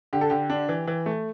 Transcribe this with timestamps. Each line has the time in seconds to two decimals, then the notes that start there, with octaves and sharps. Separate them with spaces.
0.13 D3 G4
0.21 A4
0.30 D3 G4
0.50 D4
0.69 E3
0.88 E3
1.06 A3